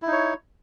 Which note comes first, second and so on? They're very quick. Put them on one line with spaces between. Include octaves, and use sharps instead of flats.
E4 D#4 C#5